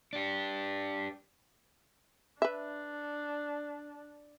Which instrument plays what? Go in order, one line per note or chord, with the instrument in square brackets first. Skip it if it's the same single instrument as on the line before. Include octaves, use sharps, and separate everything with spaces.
[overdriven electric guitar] D4 G4
[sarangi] D4 [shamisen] B4 E5